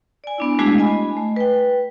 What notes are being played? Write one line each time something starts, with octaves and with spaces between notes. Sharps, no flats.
D5 G#5
B3 D4 E4
G#3 A3 D4 E4 F#4 G#4
D#5 G#5 B5
A3
B4 G5